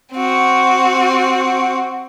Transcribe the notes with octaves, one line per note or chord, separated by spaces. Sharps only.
C4 F#4